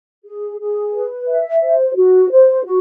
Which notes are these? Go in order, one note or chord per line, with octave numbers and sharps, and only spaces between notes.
G#4
G#4
B4
E5
C5
F#4
C5
F#4